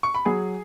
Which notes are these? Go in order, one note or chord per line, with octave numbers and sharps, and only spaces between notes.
C#6
B5
F#3 G#4 G#5